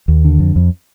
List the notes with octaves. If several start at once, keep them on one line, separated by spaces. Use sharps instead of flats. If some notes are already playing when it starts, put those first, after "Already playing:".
D#2
D3
F2
F2